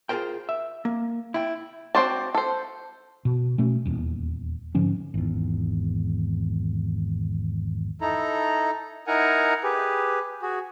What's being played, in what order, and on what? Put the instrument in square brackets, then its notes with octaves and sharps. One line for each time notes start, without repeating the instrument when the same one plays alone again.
[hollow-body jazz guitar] F4 G#4 A#4 C5 G5
E5
A#3
E4 G5
[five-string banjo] C4 F#4 C5 D5 A5
A4 C5
[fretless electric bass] B2
B2 A3 C#4
D#1 E2
G#2 D3 F3 C#4
[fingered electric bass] G#1 E2
[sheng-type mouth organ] D#4 E4 A4 A#5
D#4 E4 A#4 F#5 G#5 A#5
G4 G#4 B4
F#4 G#4